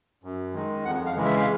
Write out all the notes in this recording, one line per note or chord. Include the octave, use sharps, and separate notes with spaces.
F#2
D#3 G#3
F2 F#5
F5
C#3 E3 G#3
E5
F5